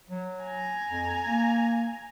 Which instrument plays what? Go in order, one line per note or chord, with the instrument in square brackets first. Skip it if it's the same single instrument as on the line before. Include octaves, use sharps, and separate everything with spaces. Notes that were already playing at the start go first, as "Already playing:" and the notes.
[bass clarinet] F#3
[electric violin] G#5 A#5
[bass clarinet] F2
A#3